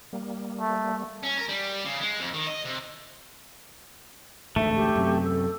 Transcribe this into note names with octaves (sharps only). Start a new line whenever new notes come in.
G3 A#3
A3
C#4
A#4
G3
C#3
G#3
F2
D#3
D#5
C3
A1 D2 G#2 A3 E5
G4
F#2 C3
A4